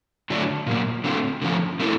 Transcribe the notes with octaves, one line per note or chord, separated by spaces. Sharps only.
D3 F#3 A3 D4
A#2 F#3 A#3
D3 F#3 A3 C4
D3 F3 A3 C#4
A3 C4 E4 A4